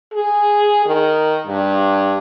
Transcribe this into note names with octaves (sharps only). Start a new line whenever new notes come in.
G#4
D#3
G2